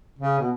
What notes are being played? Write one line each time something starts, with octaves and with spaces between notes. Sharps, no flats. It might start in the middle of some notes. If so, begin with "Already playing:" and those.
C#3
B2